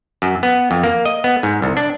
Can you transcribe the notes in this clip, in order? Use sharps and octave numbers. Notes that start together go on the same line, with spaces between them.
F#2
B3
F2
A#3
D#5
B3
G#2
C2
D4